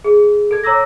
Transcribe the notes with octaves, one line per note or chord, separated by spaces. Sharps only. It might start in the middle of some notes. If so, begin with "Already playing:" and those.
G#4
A4 G#6
C#5 A#5 D6 E6 A#6